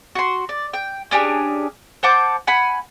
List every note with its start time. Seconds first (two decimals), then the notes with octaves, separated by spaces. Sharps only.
0.15 F#4 C6
0.49 D5
0.73 G5
1.11 C#4 D4 G4 G#4
2.03 C5 F#5 A5 D6
2.47 F#5 G#5 B5